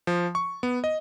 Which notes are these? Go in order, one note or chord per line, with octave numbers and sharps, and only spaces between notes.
F3
C#6
B3
D#5